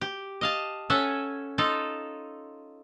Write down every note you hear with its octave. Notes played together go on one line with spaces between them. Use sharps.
G4
D#5 F5 A5
C#4 A4 E5 F#5 G#5
D#4 F4 A4